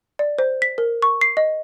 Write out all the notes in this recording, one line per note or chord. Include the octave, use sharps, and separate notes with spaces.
D5
C5
B6
A#4
C#6
C7
D#5